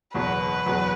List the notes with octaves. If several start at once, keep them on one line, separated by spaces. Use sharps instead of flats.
F#1 E2 B2 F#3 B4
F#1 E2 B2 F#3